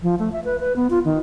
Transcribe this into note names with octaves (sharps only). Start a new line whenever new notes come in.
F3
A3
E5
B4
B4
B3
F4
D#3